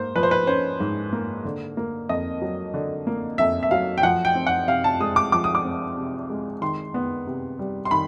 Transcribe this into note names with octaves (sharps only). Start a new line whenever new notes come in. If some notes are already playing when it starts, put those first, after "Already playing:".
Already playing: G#2 A#3 C5
F3 B4
C5
B4
C#4 C5
G#2
A#3
D3
A#3
F2 D#5
F#3
D3
A#3
F2 E5
E5
F#3 F5
G5
F3 F#5
G5
C4
F#5
C3 F5
A5
G#3 D#6
D6
F3 D6
D#6
D6
C4
C3
G#3
D#3 C6
B3
C3
G3
C6
D#3 B5